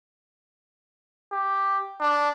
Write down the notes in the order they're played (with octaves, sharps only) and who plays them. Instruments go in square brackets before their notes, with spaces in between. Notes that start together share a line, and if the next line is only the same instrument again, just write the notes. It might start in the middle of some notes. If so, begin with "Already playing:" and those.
[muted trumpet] G4
D4